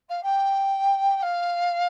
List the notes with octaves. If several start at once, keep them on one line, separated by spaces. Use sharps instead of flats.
F5
G5
F5